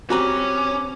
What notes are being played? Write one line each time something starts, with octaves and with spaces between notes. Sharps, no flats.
G3 C4 C#4 F#4 B4 A#5 D6